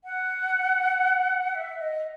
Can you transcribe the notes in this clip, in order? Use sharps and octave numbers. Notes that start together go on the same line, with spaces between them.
F#5
E5
D#5